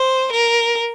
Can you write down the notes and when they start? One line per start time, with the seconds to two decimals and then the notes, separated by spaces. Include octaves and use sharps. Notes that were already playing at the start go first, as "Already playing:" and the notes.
Already playing: C5
0.32 A#4